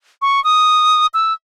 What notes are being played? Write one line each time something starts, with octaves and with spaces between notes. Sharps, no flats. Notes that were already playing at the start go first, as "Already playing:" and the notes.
C#6
D#6
E6